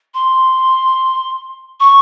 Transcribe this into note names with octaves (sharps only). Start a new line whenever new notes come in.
C6
C#6